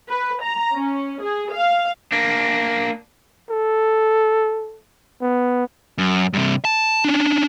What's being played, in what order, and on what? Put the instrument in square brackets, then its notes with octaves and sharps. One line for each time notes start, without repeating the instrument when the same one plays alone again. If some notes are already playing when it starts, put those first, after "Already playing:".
[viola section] B4
A#5
C#4
G#4
F5
[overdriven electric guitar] A#3 D4
[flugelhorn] A4
B3
[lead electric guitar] F#2
G2 C3
A5
C#4 D4